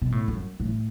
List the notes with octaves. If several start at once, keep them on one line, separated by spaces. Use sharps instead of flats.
B2
A2
F#2
A2